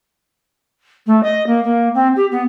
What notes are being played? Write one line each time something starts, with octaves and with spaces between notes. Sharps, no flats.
A3
D#5
A#3
A#3
C4
G4
B3